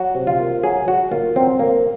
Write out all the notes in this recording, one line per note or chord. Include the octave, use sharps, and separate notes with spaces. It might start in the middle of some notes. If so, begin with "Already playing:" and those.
Already playing: F#3 F#4
C3
F4
A#3
F#3 G#4
F#3 F#4
A#3 F4
F#3 C4
A#3